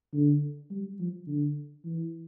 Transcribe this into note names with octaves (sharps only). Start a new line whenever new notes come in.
D3
G3
F3
D3
E3